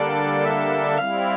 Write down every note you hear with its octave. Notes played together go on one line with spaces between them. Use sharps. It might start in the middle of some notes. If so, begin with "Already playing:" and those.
Already playing: D3 G3 A#3 D4 A4 D5
E5
G3 C4 E4 F5